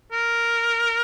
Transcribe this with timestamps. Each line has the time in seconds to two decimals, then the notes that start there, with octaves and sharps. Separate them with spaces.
0.12 A#4